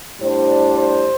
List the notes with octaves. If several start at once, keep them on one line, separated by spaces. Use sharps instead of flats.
A2 G3 D4 C5
C5